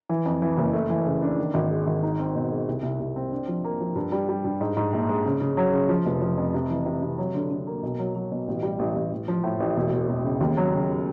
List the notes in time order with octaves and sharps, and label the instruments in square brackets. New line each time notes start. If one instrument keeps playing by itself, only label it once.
[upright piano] E3
F2
E3
F#1
A3
E3
C#3
D4
D#3
G#1
G#3
G#1
D#4
C4
B2
G#3
C2
C2
C2
C4
D4
F3
A#3
F3
G2
G3
G3
G2
G#2
G#2
A#1
G#3
C#3
C#3
F#3
C#3
F3
F1
F3
F2
C3
E3
C3
C3
F#3
D3
D3
A#3
B1
F#3
F#3
B2
A1
G3
A1
A1
A1
F3
A2
A1
E1
E1
E1
C#3
D#2
F#3
C#3